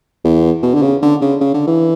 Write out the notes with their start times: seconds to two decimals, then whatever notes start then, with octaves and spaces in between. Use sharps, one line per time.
0.24 E2
0.63 B2
0.74 D3
0.82 C#3
1.02 D3
1.22 C#3
1.41 C#3
1.54 D3
1.67 E3